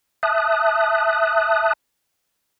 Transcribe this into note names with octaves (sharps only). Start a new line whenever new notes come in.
E5 A5 D#6 F#6